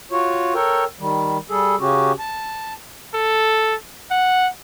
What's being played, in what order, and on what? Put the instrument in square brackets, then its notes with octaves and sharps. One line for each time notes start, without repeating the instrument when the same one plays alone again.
[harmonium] F4 F#4 C#5
A4 A#4 C#5 G5
D#3 G3
G3 G#4 A4
C#3 C#4 F#4 G4
A5
[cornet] A4
F#5